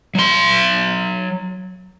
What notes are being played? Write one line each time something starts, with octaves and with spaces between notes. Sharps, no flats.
F#3 C6